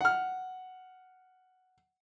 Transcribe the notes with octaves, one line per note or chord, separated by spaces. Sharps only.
F#5 F6